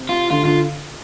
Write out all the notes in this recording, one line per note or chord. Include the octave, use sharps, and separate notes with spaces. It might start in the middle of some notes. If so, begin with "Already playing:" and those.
Already playing: C3
F4
D3 F4
D3 F4